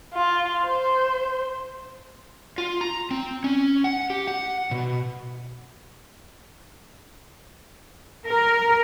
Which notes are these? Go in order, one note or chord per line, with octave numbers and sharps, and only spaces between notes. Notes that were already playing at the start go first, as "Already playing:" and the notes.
F4
C5
F4
A#5
C4
C#4
F#5
G4
F#5
B2
A#4